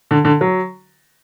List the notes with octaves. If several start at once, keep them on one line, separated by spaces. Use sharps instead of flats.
D3
D3
F#3